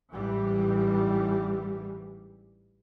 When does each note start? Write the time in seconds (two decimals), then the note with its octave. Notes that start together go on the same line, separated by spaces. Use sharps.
0.12 A1 G#2 E3 G3